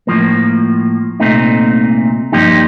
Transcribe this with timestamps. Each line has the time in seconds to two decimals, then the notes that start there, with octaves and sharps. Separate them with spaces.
0.07 A2 F3 A#3
1.20 C2 A#2 A3 C4 D#4
2.32 G2 F3 A#3 D#4 G4